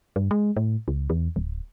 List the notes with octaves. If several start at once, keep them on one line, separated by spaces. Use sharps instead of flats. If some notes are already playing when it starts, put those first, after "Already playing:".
G2
G#3
A2
C#2
E2
D1